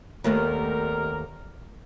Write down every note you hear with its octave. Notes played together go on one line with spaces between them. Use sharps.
D#2 C3 G3 A3 B3 A#4